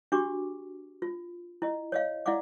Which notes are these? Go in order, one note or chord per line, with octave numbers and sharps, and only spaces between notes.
D4 F#4 G4 C#6 D6
F4
E4 D#5
C#5 D#5 F5
E4 D5 F5 F#5 D6